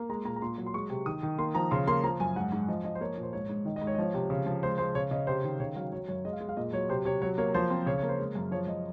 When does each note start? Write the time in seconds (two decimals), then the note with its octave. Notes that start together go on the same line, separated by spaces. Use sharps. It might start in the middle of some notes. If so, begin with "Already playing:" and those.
Already playing: A#3
0.09 G#3 A#5
0.25 A#2 A#5
0.36 A#5
0.42 A#2 C6
0.58 F#3
0.66 C6
0.74 G#3 C#6
0.90 C3
1.06 D#3 D#6
1.23 D#3
1.38 A#3 C6
1.55 F3 A#5
1.71 C#3 C6
1.87 A#3 C6
2.04 F3 A#5
2.20 F#2 G#5
2.36 G#2 F#5
2.52 G#2
2.68 F3 D#5
2.84 F3 D#5
2.95 C5
3.01 A#3 C#5
3.17 A#2
3.23 C5
3.33 G#2 C#5
3.49 G#2
3.65 D#3 D#5
3.76 D#5
3.81 G#2
3.87 C#5
3.95 D#5
3.98 F3 C#5
4.14 C3
4.30 C#3
4.46 F3
4.63 G#3 C5
4.78 G#3 C5
4.95 C#3 C#5
5.11 C#3 D#5
5.27 C3 C5
5.44 D#3
5.60 C#3 C#5
5.76 F#3 F5
5.92 F#3 C#5
6.09 F#2 C#5
6.25 G#3 D#5
6.33 F5
6.41 G#3
6.49 F5
6.57 A#2 D#5
6.73 F#3 C#5
6.89 C3 C5
7.05 C3 C#5
7.22 F#3 C#5
7.38 A#3 C#5
7.54 F3 C5
7.70 C4
7.86 C#3 C#5
7.98 C#5
8.03 A#3
8.09 C5
8.19 G#3
8.35 F#2
8.51 F3 C#5
8.67 F#2 D#5